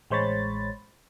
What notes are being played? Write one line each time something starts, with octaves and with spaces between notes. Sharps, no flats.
A1 G#3 C5 C#5 B5 A6